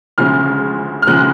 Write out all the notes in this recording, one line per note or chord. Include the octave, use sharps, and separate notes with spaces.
D2 C#3 F3 G#3 F6
F6
D2 C#3 F3 G#3 F#6